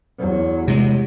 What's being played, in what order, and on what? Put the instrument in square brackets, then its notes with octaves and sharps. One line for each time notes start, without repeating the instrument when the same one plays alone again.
[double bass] E2 F#3
[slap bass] C3 G#3